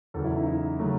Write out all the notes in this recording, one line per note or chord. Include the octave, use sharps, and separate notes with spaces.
E2 C#3 F#3 A4
E4
D#4
E4
C#3 F#3 A3